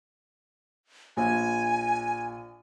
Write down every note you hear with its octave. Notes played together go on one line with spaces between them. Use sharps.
A#1 G#5